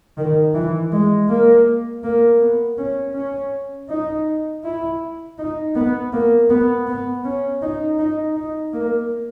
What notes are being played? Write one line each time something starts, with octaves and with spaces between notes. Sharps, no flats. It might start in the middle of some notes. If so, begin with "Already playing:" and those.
D#3
E3
G#3
A#3
A#3
B3
C#4
C#4
D#4
E4
D#4
B3
A#3
B3
B3
C#4
D#4
D#4
D#4
A#3